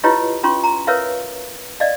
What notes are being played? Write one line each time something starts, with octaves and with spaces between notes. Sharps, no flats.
E4 F4 G4 B4 C#5 D#5
C#4 F4 C6 C#6
A#5
A#4 B4 C#5 E5 F5
D5 D#5 F5